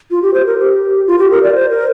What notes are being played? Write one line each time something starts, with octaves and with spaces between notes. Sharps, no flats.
F4
G4
C5
A#4
G4
F4
G4
A#4
D5
C5
A#4